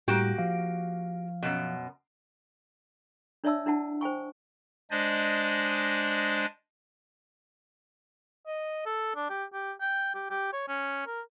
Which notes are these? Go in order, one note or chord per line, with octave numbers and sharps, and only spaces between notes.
A2 G3 A#3 F#4 G4
F3 F5
F#2 B2
D4 C#5 D5 E5 A5 E6
D4 E4 F#5 A5
C5 G5 G#5 C#6
G#3 D4 C5 D5 D#5 G#5
D#5
A4
D4
G4
G4
G5
G4
G4
C#5
C#4
A#4